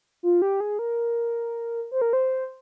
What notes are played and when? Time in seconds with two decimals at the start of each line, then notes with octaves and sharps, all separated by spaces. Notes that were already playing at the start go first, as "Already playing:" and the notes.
0.23 F4
0.42 G4
0.60 G#4
0.79 A#4
1.92 C5
2.02 A#4
2.13 C5